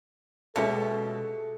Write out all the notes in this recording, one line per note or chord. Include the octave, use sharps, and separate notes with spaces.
B2 G#3 A3 C#4 G4 A4 E5 C#7